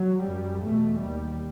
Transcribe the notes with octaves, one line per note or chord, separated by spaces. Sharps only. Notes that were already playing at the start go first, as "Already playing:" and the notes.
Already playing: F#3
F#2 G3
E2 B2 A3
D#2 G3